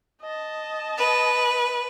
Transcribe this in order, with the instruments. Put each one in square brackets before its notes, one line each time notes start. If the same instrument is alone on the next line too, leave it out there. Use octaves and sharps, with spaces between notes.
[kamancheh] D#5 A5
[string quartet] B4